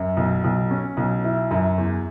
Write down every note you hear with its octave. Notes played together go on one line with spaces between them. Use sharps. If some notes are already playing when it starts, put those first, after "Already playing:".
Already playing: F#2
B1
B1
C#4
B1
E4
F#2
E2